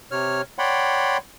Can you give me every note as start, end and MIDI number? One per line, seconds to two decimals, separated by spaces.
0.11 0.42 48
0.11 0.42 73
0.11 0.42 89
0.59 1.17 73
0.59 1.17 74
0.59 1.17 78
0.59 1.17 79
0.59 1.17 83
0.59 1.17 84